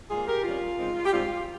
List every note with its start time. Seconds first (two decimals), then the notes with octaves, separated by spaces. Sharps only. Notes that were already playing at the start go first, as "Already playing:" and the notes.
0.10 G#2 G3 A#3 F4 G#4
0.27 G4 A#4
0.44 C3 D#3 G3 C#4 F4
0.78 C#3 G#3 C4 D#4
1.05 G4
1.12 G#2 G3 C4 F4